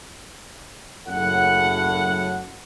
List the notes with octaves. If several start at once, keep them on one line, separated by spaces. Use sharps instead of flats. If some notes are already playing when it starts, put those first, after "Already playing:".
F#1 F#2 A2 F#5